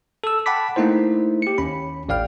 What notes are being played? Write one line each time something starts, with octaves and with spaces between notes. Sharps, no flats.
A4 E6
F#5 G5 A5 B5 D6 B6
A3 A#3 D#4 E4 C5
G4 C#7
D#2 C#4 B5
A1 D5 F5 G5 F6